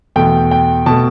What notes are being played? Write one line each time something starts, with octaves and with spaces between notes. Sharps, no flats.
E2 B2 A3 G5
G5
B2 A3 A5